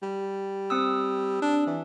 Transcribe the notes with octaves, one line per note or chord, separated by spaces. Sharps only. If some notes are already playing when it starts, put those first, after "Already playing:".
G3
C4 D#6 E6
D4
E3